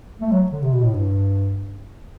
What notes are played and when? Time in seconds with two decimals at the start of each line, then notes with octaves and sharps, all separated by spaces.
0.21 A3
0.32 F#3
0.52 D3
0.62 C3
0.73 B2
0.83 A2
0.94 G2